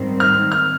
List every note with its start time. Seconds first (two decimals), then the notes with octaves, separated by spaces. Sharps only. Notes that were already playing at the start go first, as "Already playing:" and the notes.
Already playing: G#2 D#3 G3 C4
0.20 F6
0.52 F6